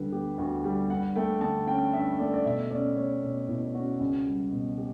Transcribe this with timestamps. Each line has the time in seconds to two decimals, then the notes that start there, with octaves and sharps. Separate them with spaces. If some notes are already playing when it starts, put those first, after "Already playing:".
Already playing: D2 D3 G3 B4
0.12 B3 G4
0.38 D2 F#4
0.64 G3 G4
0.90 G2 F#5
1.16 A3 G5
1.41 D3 A5
1.67 C#4 G5
1.93 G2 E5
2.19 A3 D5
2.34 D5
2.45 B2 E5
2.71 C#4 D5
2.96 A3 C#5
3.22 B2 C#5
3.48 B2 E4
3.74 C#4 F#4
4.00 C#2
4.26 G3
4.52 B2
4.78 G4